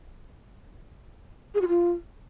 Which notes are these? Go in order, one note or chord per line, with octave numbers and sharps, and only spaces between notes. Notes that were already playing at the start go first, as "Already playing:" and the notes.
G#4
F#4
F4